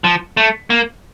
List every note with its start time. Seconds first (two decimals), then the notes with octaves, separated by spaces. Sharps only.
0.04 F3
0.37 A3
0.70 A#3